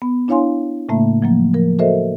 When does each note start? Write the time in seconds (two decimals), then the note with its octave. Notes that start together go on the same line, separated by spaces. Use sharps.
0.02 B3
0.28 D4 E4 C#5 F5 G#5 C6
0.89 A2 C#3 A3 A#3 E5
1.22 F3 F#3 A#3
1.54 F3 A#4
1.79 F#4 A4 A#4 C5 D#5 E5